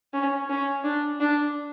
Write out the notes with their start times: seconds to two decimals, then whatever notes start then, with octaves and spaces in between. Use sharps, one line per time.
0.14 C#4
0.50 C#4
0.84 D4
1.20 D4